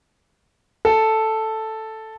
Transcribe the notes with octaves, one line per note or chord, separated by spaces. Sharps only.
A4